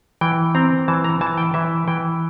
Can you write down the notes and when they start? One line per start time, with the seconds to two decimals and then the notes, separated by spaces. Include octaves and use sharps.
0.21 E3 G5
0.55 C4 A#5
0.88 E3 A5
1.04 A#5
1.21 E3 A5
1.38 G5
1.54 E3 E5
1.88 E3 G5